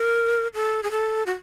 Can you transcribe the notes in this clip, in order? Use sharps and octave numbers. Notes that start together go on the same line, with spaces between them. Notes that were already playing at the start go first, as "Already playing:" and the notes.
Already playing: A#4
A4
G#4
A4
F#4